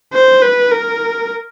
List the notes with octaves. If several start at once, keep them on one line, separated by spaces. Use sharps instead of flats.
C5
B4
A#4